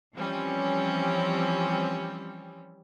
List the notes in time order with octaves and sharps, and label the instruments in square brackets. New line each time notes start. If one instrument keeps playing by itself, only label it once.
[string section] E3 F3 G3 C4 C#4